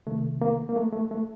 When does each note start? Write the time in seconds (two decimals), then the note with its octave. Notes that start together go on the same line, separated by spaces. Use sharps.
0.07 C2 C3 D#3 A3
0.41 A#3
0.69 A#3
0.76 A3
0.93 A3
1.11 A3